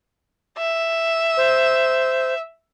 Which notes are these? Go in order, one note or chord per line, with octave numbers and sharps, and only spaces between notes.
E5
C5